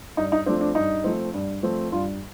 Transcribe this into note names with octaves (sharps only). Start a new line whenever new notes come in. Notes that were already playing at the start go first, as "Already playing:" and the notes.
G2 D#4
D#4
F3 A3 C4 D4
D4
G2 D#4
F3 A3 C4
G2
F3 A3 C4
G2 F4